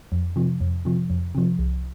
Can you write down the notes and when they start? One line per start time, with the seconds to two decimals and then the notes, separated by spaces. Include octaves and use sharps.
0.12 F2
0.36 C3 F3
0.61 F2
0.85 C3 F3
1.10 F2
1.35 C3 F3
1.59 C2